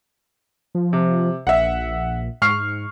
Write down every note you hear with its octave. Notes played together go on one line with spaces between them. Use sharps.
F3
C3
A#1 E5 F#5
G#2 C#6 F6 C7